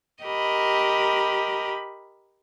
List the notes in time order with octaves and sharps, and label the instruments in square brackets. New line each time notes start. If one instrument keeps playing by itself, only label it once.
[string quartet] G4 A#4 D#5 B5